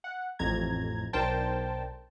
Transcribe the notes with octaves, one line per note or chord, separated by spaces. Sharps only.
F#5
A1 F2 A#5 G#6
B1 D4 A#4 C5 G5 A5